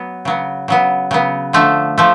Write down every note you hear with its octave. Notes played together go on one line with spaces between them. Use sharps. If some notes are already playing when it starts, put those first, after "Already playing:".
Already playing: F#3 B3
C#3 F#3 B3
C#3 F#3 B3
C#3 F#3 B3
D3 F3 A3
F3 A3